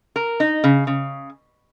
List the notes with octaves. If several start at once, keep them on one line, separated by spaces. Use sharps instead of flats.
A#4
D#4
C#3
C#3